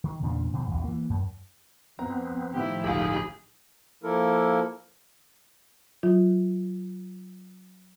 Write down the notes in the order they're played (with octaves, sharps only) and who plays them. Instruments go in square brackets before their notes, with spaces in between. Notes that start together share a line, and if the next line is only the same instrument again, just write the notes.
[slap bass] D#3
E2 A#2 C#3 D4
F2 B2 D#3
A1 E2 A2
E3 A#3
F#2
[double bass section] F2 [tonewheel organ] B3 C4 [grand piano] A#5
[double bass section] A2 D#3 F3 [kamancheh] E4 G4
[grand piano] G1 C#2 F4 [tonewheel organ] D#4 G4 B5 [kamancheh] G#4
[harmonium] F3 A#3 E4 A4 A#4
[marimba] F#3 F4